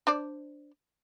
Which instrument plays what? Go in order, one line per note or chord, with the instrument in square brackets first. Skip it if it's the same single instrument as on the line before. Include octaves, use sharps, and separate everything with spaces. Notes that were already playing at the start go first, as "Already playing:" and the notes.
[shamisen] D4 C5 D5